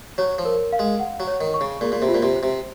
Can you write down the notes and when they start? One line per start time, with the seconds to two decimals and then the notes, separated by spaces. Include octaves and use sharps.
0.18 F#3 C#5
0.38 F3
0.45 A#4
0.73 F5
0.79 G#3
1.00 F#5
1.20 F#3
1.27 C#5
1.41 D#3
1.54 C#6
1.61 C#3
1.81 A#2 G#4
1.92 A#2
2.02 C3
2.09 F4
2.14 A#2
2.23 C3
2.36 C5
2.43 C3